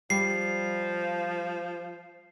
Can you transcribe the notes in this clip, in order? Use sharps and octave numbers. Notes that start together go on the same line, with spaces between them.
F3 G3 C7